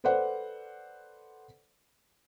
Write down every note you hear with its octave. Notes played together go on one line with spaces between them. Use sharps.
A4 B4 C5 D5 F#5